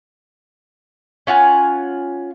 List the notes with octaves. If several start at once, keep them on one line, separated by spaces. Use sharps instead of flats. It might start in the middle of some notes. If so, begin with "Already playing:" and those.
C#4 F4 F#5 G#5